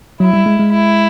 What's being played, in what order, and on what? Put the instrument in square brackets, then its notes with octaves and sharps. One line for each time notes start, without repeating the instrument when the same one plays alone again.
[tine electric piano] F#3 [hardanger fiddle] E4
[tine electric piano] G3
G#3
G#3
[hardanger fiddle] E4